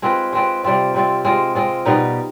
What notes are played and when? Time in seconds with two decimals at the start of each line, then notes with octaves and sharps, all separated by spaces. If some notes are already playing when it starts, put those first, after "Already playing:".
0.02 G#3 C4 F4 B4
0.33 G#3 C4 F4 B4
0.64 C3 G3 C4 F4
0.94 C3 G3 C4 F4
1.25 G#3 C4 F4
1.55 G#3 C4 F4
1.85 B2 G3 B3 D#4